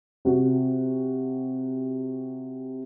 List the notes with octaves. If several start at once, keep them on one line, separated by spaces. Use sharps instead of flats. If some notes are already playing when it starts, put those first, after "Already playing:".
C3 F#4